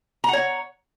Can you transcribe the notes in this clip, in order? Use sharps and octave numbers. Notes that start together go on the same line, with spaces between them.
C#5 F#5 A#5